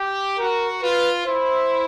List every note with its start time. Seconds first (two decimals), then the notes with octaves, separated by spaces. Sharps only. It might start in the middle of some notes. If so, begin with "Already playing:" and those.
Already playing: G4
0.38 F#4 A#4
0.82 F4 B4
1.26 E4 C5